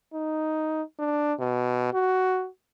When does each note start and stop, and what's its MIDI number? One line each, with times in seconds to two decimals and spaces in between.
0.14 0.82 63
0.99 1.33 62
1.40 1.90 47
1.94 2.47 66